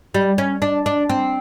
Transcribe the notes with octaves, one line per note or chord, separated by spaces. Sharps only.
G3
C#4
D4
D4
C4